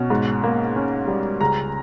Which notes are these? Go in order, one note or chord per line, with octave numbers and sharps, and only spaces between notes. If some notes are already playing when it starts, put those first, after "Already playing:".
Already playing: B2 C#4
G#2
A#3
C#4
G3
C#2 A#5